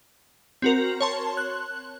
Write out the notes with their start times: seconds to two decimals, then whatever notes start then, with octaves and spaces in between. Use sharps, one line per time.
0.62 C4 F#4 A#4
1.01 C#5 A5 C6
1.37 F#6